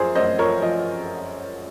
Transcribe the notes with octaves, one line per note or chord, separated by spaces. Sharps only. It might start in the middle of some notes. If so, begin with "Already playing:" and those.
Already playing: F#2 F3 G#4 C5
F#2 C5 D#5
F3 A#4 C#5
F3 D#5